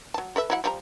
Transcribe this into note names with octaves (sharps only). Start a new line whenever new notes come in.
F#3 A5
A4 B4 E5
F#3 E4 F#5
F3 G3 A#5